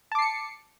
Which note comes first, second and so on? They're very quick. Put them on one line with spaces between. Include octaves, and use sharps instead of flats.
A5 D6 C7 C#7